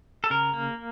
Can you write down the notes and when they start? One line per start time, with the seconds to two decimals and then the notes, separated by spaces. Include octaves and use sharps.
0.24 A4
0.30 C#3 A#4
0.54 A#3